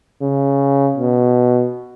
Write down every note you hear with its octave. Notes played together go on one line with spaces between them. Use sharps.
C#3
B2